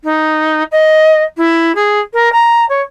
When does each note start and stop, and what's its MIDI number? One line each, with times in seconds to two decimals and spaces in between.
0.04 0.63 63
0.71 1.23 75
1.37 1.72 64
1.75 1.99 68
2.13 2.31 70
2.32 2.65 82
2.69 2.81 73